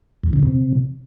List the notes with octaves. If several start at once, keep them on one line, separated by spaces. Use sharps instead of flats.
E2
C#3
C3